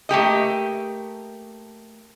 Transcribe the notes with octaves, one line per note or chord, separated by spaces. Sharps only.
A3 A#3 G4 D#5